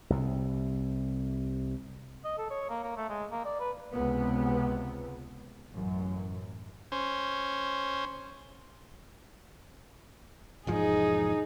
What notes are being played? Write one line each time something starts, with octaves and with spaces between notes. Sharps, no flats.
C2 C3
D#5
A4
C#5
A#3
A#3
A3
G#3
A#3
D5
B4
C#2 C3 B3
A1 F#2
C#4 C5
E1 G#2 F3 D#4 G#4